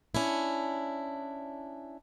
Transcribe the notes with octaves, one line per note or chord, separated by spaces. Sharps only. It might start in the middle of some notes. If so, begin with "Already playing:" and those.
C#4 D4 E4